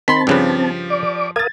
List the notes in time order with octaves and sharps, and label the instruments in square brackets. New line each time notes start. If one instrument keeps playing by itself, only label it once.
[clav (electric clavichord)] D#3 [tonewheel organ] C4 A5 [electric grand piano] B5 C6 B6
[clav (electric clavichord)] G2 C#3 B4 [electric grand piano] F3 G4
[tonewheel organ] D5 D6
[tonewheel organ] A#4 F5 D#6 [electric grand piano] G#6 A6